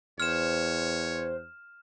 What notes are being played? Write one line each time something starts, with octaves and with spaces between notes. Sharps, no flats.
E2 C5 C#5 F6 E7